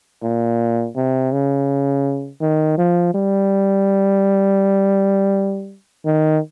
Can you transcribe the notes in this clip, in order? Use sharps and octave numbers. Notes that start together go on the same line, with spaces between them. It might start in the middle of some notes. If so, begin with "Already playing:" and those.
A#2
C3
C#3
D#3
F3
G3
D#3